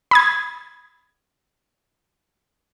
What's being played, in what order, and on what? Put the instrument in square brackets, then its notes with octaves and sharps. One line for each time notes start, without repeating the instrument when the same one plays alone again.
[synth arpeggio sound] B5 D#6 G#6